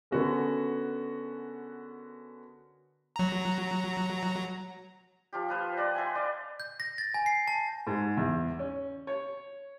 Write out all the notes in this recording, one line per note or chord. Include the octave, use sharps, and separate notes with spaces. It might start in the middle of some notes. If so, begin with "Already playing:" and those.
D3 B3 C#4 F#4 G#4 A#4
F#3 A#5
F3 F4 G4
F4 B4 C5
B4 D5 D#5
B4 E5 G#5
D5 D#5 F5
G6
A#6
A6
G#5
C7
A5
G#2
E2
C#4
C#5